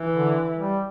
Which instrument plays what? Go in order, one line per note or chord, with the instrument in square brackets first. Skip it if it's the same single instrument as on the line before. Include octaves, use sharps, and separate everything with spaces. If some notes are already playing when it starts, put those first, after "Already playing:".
Already playing: [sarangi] E3
[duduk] D3
G3